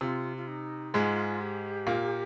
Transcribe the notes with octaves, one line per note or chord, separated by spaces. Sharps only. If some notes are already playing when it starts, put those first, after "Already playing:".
C3 F4
F4
D#4
G#2 G#3 F4
G4
A#2 A#3